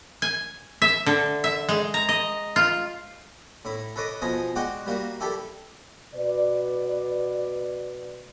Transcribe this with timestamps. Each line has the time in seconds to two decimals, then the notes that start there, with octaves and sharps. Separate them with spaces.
0.22 G#5
0.82 E5
1.06 D3
1.44 E5
1.69 G#3
1.94 A#5
2.09 D#5
2.56 F4
3.65 A2 E4
3.96 A4 B4 C#5 D#5 D6
4.22 B2 F3 D#5 G#5 D#6
4.56 G#3 F#4 D5 F#5 G5
4.86 G3 A#3 F#4
5.20 E4 G4 A4 D5
6.15 B2 B4 D5